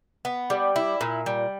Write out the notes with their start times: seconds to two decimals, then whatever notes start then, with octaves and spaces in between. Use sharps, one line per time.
0.25 B3
0.50 G3
0.76 E4
1.01 A#2
1.26 G3